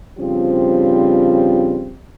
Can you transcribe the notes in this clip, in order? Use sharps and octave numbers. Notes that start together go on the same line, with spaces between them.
G2 C#3 F3 G3 C4 F4